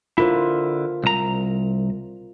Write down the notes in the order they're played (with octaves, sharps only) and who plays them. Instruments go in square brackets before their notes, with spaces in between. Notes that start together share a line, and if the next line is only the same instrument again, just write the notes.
[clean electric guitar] D3 E4 [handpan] F4 A#4 C5
[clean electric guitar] C2 A#5